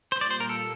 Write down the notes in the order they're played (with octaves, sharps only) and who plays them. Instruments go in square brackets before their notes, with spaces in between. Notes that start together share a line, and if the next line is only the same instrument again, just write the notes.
[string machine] A#2 G3 A#3 F4 [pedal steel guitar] C5
[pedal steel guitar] D5
C5
A#4
A4